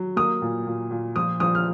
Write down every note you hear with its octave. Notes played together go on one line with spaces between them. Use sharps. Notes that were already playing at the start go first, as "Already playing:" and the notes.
Already playing: F#3
A#3 D#6
A#2
A#2
A#2
F3 D#6
F3 D#6
F6